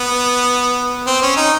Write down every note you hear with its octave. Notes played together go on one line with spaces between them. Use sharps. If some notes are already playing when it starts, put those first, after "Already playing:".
Already playing: B3
C4
C#4
D#4